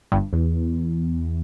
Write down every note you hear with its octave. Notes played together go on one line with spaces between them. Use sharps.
G1 G2
E2